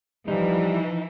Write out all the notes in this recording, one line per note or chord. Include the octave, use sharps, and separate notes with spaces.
E3 F3 G3 D#4